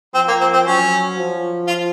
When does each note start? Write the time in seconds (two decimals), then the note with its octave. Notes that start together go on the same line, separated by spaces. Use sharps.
0.15 F3 C4
0.28 A#3
0.41 C4
0.54 C4
0.66 F#3 C#4
1.17 F3
1.68 F4